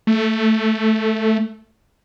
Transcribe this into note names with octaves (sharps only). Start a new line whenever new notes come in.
A3